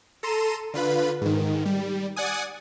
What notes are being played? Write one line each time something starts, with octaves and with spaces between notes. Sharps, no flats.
A4 A#5 C6 D#7 E7
D3 F4 B4 B5
G#2 D#3
G3
D5 F#5 G#5 D#6